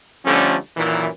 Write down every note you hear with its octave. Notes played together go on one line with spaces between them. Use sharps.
D3 F3 G3 A3 C#4
F#2 A#2 D#3 E3